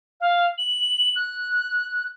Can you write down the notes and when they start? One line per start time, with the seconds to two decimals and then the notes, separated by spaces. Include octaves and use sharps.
0.20 F5
0.58 F#7
1.16 F#6